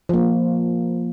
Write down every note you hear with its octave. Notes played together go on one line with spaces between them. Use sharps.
F3 A#3